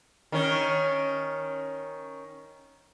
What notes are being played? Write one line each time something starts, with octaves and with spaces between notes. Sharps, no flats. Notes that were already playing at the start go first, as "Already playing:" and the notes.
D#3 C#4